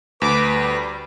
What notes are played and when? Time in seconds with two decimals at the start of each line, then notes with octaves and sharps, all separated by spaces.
0.22 D2 B4 D6
0.52 G3